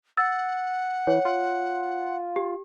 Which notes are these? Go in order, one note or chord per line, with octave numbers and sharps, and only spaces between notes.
F#5 E6 A6
E3 C#5
F4
G4